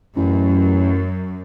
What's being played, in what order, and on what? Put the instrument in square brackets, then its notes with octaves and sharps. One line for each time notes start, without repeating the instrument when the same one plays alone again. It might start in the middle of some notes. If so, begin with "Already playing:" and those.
[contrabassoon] A1 [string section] F#2